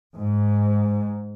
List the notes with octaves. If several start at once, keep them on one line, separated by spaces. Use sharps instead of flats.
G#2